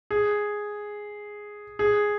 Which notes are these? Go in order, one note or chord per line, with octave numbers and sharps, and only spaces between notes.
G#4
G#4